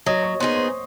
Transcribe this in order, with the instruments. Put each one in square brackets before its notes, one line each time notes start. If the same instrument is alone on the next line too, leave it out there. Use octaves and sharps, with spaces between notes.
[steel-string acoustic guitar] F#3 [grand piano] D#5 D#6
[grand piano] C#5 C#6
[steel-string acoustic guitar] B3 D#4 G#4 [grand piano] C5 C6
[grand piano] C5 C6